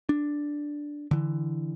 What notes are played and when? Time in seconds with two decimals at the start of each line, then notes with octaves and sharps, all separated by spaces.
0.09 D4
1.11 D3 E3